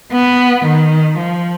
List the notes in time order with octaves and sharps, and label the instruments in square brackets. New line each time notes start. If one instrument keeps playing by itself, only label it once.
[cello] B3
D#3
F3